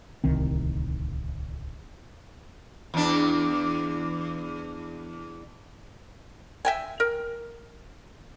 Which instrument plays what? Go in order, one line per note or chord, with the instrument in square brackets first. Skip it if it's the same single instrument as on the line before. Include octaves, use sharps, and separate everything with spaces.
[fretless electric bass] D1 C2 D#3 C4
[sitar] E2 D4
[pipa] E5 G5 G#5
A#4